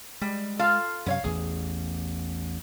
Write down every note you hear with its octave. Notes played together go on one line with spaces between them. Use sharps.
G3 G#3
F4 A4 F5
F#2 C3 B3 C#5 F5
A1 E2 G#4